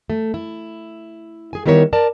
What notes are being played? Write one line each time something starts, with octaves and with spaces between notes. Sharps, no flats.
A3
E4
G#4 G#5
D#3 G3 B3 E4 A#4 C#5
A#4 D5 A5